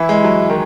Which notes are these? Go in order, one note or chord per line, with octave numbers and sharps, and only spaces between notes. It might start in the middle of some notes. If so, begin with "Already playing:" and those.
Already playing: E3 E4
G#3
F#3
D#3